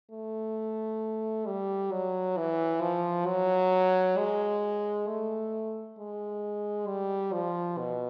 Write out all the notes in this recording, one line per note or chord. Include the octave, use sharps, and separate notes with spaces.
A3
G3
F#3
E3
F3
F#3
G#3
A3
G#3
G3
F3
B2